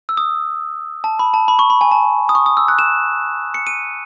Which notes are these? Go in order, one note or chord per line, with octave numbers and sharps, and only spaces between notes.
E6
D#6
A5
B5
A5
B5
C#6
B5
G#5
A5
D#6
C#6
D#6
E6
F#6
E7
C#7
D#7